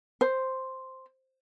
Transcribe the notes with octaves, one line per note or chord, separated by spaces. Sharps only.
C5